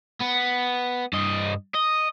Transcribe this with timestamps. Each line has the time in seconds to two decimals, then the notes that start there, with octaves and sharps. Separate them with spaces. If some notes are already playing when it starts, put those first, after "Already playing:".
0.21 B3
1.13 G2 D#5
1.75 D#5